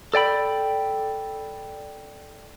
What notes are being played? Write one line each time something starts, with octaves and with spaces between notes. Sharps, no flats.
A4 D5 G5 B5